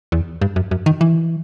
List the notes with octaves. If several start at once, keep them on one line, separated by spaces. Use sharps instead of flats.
E2
G2
F#2
F#2
D#3
E3